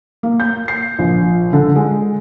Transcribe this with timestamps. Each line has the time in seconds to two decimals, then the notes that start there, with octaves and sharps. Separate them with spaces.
0.23 A#3
0.40 G6
0.68 C7
0.99 A#1
1.53 D3
1.76 G#3